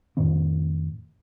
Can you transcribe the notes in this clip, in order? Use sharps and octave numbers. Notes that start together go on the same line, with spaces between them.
F2 A2 D#3 C4